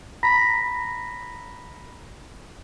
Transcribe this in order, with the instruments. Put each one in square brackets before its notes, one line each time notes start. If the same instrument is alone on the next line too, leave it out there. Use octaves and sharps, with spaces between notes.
[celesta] A#5 B5 A#6 B6